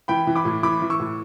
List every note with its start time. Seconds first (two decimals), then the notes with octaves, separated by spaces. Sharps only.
0.08 E3 G5 B5
0.27 E3
0.36 B5 D6
0.45 A2
0.63 E3 B5 D6
0.82 E3
0.90 C#6 E6
1.00 A2